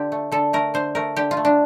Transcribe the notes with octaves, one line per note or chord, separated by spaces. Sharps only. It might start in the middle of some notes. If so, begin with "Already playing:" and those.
Already playing: D3 F4 G4
A3
D3 A4
A3 A#4
D3 C5
A3 A#4
D3 G4
F4
A3
D4